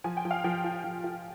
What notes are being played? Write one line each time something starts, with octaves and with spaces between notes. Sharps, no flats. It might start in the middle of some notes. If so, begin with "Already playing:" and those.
F3 G#5
G5
F3
F5
F3 G5
F4
F3
F4